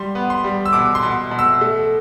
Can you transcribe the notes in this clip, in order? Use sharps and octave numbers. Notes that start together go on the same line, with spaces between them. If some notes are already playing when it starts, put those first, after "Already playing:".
Already playing: G3 C6
B3
C6
G3
E6
B2 D6
C6
B2
B2
E6
A3